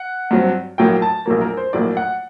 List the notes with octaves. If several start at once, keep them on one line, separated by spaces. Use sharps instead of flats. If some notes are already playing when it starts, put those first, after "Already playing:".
Already playing: F#5
G2 F#3 C4
A#1 A2 F#3 A#3 G5
A5
A#1 A2 F#3 A#3 A#4
A#4
C5
A#1 A2 F#3 A#3 D5
F#5